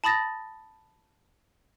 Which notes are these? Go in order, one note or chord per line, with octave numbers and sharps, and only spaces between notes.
A5 B5 D#6 A6 A#6